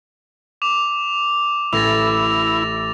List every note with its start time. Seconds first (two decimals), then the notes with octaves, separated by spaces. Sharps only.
0.62 D6 F7
1.73 A1 C#4 E4 A4 A6 A#6 F7